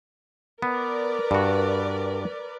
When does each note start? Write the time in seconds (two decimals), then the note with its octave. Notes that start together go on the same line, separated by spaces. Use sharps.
0.62 B3 A#4 B4 D5
1.31 G2 F#4